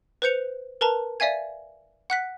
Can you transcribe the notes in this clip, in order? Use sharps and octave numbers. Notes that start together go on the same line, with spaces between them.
B4 C5 G6 C#7 F7
A#4 B4 A5 A#5
D5 E5 F5 G#5 G#6
F#5 F#6 B6